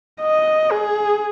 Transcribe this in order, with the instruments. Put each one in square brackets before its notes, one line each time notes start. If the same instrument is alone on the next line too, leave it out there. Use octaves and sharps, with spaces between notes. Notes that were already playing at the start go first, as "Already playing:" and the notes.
[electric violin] D#5
G#4